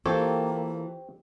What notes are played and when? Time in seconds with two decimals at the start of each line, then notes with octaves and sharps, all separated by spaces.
0.06 E3 A#3 C4 F4 G4 A4 C#5